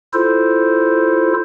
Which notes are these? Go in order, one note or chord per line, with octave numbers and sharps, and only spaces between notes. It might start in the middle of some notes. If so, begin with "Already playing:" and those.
E4 F4 A4 C5